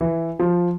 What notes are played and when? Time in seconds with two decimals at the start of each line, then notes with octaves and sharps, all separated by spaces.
0.01 E3
0.39 F3